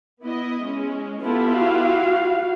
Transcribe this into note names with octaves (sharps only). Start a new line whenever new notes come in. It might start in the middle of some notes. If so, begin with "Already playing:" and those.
B3 E4 D#5
G#3 C#4
B3 E4 F4 G4 A4
F#4 F5